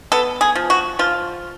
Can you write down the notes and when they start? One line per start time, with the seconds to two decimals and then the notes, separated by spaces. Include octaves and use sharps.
0.12 B3 A4
0.41 G#4
0.55 F3
0.70 F#4
0.99 F3 F4